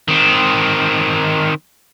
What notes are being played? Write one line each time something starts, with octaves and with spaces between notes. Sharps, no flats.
D#3 C4